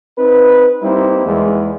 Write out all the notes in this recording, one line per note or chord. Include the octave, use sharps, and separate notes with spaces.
C4 D#4 B4
G3 A#3 C4 D#4 E4
E2 G#3